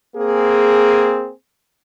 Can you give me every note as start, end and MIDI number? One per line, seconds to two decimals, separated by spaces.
0.16 1.32 58
0.16 1.32 60
0.16 1.32 68